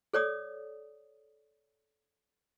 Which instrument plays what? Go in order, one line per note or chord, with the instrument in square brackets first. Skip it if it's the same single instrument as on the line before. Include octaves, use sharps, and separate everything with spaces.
[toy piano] A4 C#5 D5 D#6